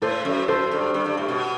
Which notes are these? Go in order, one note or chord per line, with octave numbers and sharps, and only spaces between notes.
A2 A4 C5
F#2
F#2 A4 C5
G2
G2
G2
A2
B2